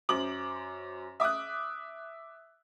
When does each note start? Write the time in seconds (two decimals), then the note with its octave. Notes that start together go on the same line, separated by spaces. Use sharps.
0.09 F#2 C5 D6 F#7
1.20 E5 D6 D#6 F#6